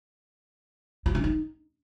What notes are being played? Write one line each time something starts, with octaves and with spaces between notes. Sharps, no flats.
F4
C#4
D#4